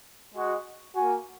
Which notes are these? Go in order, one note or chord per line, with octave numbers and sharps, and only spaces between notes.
G#3 F#4
A#3 F#4 G#5